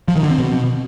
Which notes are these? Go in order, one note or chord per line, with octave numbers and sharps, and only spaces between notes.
F3
D#3
D3
C4
B2